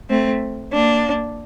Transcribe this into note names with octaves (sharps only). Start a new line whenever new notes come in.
A3 C4
A#3 D4